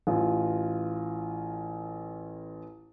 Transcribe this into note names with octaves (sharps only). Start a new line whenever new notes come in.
A1 F4